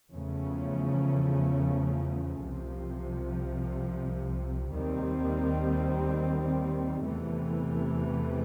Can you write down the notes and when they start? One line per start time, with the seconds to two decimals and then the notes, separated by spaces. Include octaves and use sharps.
0.11 E2 C#3 F3 A3 C#4
2.41 C2 C3 F3
4.72 D#2 D#3 G3 C4
7.02 E2 C3 E3 A3